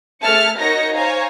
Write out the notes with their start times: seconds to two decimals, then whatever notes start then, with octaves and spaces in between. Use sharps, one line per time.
0.23 A3 G#4 E5 A5 F6 C#7
0.58 D#4 F#4 A#4 C#5 A#6 C#7
0.95 C5 C#5 F5 G#5 A#5